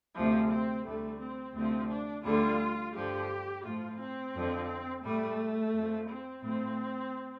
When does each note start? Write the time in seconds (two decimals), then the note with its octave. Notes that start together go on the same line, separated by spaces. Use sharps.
0.15 D2 C3 F3
0.50 C4
0.85 D2 D3 G3 A3
1.19 C4
1.55 D2 C3 F3 C4
1.89 D4
2.24 D2 D3 G3 F4
2.94 G2 D3 F3 G4
3.64 A2 F3 F4
3.98 C4
4.34 F2 D3 F3
5.03 A2 G3 A3
5.73 F2 F3
6.08 C4
6.42 A2 F3 C4